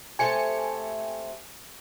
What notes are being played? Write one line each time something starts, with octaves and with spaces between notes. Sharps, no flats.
A3 C4 G4 G#5 C#7